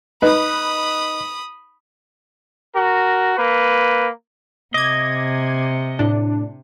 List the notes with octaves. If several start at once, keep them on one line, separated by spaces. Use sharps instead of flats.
D#4 B4 B5 D#6
F#4 A#4
A#3 B4
C3 D#5 D6 G#6
A2 D4